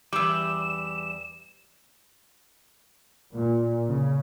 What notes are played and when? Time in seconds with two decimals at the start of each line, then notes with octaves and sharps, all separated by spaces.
0.13 E2 G3 D6 E6 E7
3.34 A#2
3.89 C#3